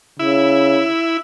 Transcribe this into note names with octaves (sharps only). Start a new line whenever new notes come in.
C#3 E4